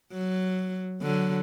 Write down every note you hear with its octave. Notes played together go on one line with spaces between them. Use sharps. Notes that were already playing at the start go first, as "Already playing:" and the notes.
F#3
D3 F#3